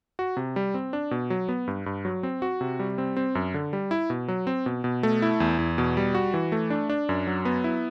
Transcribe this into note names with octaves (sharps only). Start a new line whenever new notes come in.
F#4
C3
G3
C4
D4
B2
F#3
B3
G2
G2
F#3
C4
F#4
C3
G3
C4
C4
F#2
D3
G3
E4
B2
F#3
C4
B2
B2
A3
E4
E2
E2
B2
G3
F#4
E3
A3
D4
D4
F#2
F#3
B3
E4